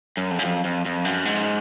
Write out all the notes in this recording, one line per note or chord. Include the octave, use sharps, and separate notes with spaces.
F#2
F2
F#2
F2
F2
F2
F#2
G#2